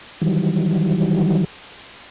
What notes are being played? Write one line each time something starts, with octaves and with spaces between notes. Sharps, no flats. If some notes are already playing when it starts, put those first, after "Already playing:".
D#3 E3 F#3 G3